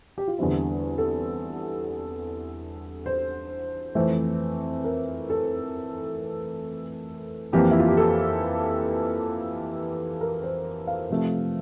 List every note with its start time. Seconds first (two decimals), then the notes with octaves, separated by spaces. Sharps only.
0.18 G4
0.28 F4
0.38 E2 D3 G3 C4 E4
0.98 A4
3.06 C5
3.95 F2 E3 A3 C4
4.84 A#4
5.30 A4
7.53 F2 E3 A#3 G4
7.71 E4
7.79 F4
7.88 G4
7.97 A4
10.21 A#4
10.43 C5
10.87 F5
11.10 C3 F3 A3